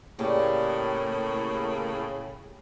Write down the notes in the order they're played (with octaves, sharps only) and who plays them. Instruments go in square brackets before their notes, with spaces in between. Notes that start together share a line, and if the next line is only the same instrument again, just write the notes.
[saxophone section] A2 C#3 [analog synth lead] A#3 [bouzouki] G4 [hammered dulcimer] D5 A5 C6